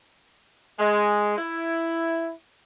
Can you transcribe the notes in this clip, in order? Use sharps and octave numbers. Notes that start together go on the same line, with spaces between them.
G#3
E4